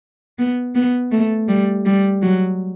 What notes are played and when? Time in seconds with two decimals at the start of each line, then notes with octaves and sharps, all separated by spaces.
0.39 B3
0.75 B3
1.12 A3
1.48 G3
1.86 G3
2.22 F#3